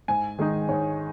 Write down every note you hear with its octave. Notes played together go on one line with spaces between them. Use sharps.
G#2 G#5
D#3 G#3 D#4
G#2 C#5